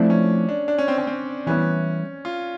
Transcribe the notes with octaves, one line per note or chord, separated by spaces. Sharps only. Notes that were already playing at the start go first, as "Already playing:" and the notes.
Already playing: F3 A3 C4 D4 E4
C#4
D4
D4
C#4
C4
C#4
C4
E3 G3 B3 C#4 E4
F4